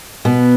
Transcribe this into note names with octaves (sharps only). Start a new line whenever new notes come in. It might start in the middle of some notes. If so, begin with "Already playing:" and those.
B2 B3